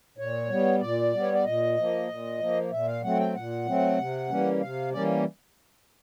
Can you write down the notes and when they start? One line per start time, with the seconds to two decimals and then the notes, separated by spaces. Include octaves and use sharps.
0.18 A#2 C#5
0.49 G3 B3
0.81 A#2 D5
1.13 G3 B3
1.22 C#5
1.33 D5
1.45 A#2 D#5
1.77 F3 A#3
2.08 A#2
2.39 F3 A#3
2.71 A#2 E5
2.87 F5
3.03 F#3 A3 C4 F#5
3.19 G5
3.35 A#2 F#5
3.66 F#3 A3 C4
3.98 C3
4.29 E3 G3 A#3 C#4
4.61 C3 F5
4.93 E3 G3 A#3 C#4 D5